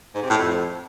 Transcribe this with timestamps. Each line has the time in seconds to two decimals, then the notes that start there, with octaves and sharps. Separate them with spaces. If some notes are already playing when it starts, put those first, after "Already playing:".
0.15 G#2
0.22 C3
0.30 A2
0.37 F2